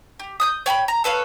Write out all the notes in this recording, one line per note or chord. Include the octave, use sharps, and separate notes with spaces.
G4
D#6 F#6 G6
C#5 G5 G#5 B5
A#5
A4 B4 C#5 F5